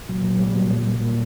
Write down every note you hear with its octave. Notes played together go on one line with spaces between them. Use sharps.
A#2 F#3
A#2 F#3
A#2 G3
A#2 F#3
A#2 G3
A#2
A#2